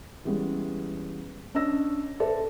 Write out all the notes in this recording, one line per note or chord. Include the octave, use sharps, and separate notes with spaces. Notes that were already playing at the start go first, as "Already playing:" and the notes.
E3 G3 G#3 B3 C#4
C#4 D4 D#5 E6 A#6
A4 B4 C5 D5 E5 A5